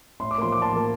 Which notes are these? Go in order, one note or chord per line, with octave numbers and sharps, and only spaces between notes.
A2 C6
D6
F3 A#3 C6
A2 D6
A5 C6
F3 A#3